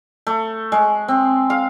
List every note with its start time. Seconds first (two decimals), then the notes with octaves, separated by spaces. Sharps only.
0.27 A3
0.72 G#3
1.08 C4
1.50 F5